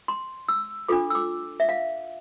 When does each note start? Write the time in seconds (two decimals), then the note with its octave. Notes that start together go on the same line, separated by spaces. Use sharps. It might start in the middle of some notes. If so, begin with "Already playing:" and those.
0.08 C6
0.48 E6
0.88 D4 F4 A4 D6
1.10 E6
1.15 D6
1.60 E5
1.69 F5